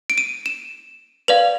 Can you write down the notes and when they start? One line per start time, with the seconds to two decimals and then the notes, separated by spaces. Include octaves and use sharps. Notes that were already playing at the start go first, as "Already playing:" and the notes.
0.10 D7
0.18 D#7
0.46 E7
1.28 B4 D5 F5 F7